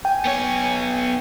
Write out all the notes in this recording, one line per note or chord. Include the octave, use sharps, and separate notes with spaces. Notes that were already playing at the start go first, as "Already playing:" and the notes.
G5 G#5
B3 C#5